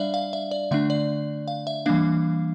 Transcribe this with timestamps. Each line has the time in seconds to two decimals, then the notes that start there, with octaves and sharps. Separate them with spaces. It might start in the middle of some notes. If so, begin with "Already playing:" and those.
Already playing: G3 D4 D5 E5 F5
0.14 F5
0.33 E5
0.51 D5
0.71 D3 A3 D4 E5
0.90 D5
1.48 F5
1.67 E5
1.86 E3 G3 A#3 D4 F5